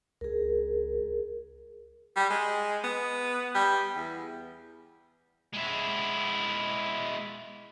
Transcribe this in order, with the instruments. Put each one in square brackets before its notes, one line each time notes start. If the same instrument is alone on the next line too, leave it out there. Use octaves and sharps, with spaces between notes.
[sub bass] C#2 [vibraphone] G#4 A#4
[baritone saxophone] G3
G#3
B3
G3
E2
[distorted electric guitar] G#3 E4